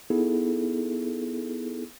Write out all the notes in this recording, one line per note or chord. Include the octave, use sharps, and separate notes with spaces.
B3 D#4 E4 G#4 A4